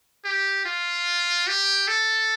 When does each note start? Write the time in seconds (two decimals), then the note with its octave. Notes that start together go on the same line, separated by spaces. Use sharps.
0.25 G4
0.65 F4
1.47 G4
1.87 A4